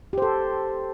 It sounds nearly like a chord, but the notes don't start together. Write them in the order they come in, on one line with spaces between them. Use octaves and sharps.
G4 C5 A4